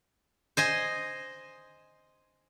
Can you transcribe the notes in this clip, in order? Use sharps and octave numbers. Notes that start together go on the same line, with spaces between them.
C5 D#5 G#5